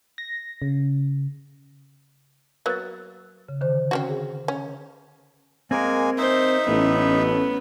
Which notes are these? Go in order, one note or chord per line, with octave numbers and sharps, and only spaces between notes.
A#6
C#3
F#3 A#3 B3 F#6 A6
C#3
D3 D#3 C5
C4 C#4 F#4
G#4
C#4
G#3 A#3 C4 A#4 G#5
D#4 C5 E5
A1 A2 B3 C#4